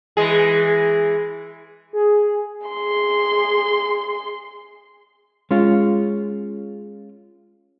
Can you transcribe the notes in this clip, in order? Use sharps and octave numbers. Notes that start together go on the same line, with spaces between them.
E3 G#3 G#4
G#4
G#4 C6
G#3 C#4 F4